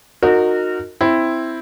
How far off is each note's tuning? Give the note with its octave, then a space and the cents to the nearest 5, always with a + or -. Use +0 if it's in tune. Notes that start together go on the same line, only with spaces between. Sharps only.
D#4 -10 F#4 -20 A#4 -25
C4 +0 E4 +0